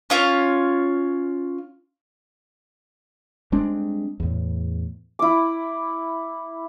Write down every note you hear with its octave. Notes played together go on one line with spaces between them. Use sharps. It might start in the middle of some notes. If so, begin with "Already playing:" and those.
C#4 F4 C#5
G3 G#3 C4 D4
E2 A2
E4 D6